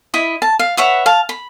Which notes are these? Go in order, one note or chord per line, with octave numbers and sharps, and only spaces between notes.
E4 D#5 B5
A5
F5
B4 C#5 E5 F#5
F5 A5
B5